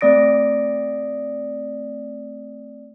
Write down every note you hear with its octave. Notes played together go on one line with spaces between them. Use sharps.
A3 C4 D5 D#6 A#6 D7